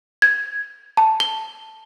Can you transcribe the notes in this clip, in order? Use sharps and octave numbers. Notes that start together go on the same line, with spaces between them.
G#6
A5
G7